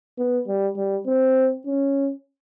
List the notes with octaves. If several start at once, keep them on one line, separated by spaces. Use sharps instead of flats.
B3
G3
G3
C4
C#4